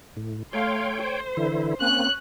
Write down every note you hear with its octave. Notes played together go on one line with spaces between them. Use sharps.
A2
A3 C#5 F5 G5 C6
C5
D3 E3 E4
A#3 C4 C#4 F#6